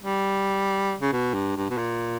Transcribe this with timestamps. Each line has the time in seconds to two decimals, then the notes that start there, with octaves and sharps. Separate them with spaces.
0.03 G3
1.01 C#3
1.13 B2
1.34 G2
1.56 G2
1.70 B2
1.78 A#2